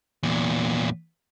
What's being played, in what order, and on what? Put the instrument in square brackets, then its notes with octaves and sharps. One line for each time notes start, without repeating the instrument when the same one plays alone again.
[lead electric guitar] E2 A#2